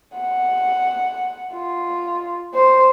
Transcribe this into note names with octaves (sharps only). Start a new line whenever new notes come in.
F#5
F4
C5